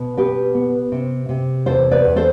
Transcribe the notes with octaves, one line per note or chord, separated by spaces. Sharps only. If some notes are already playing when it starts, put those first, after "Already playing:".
Already playing: B2
B3 G4 B4
B3
C3
C3
E2 A4 C5
B4 D5
E2
A4 C5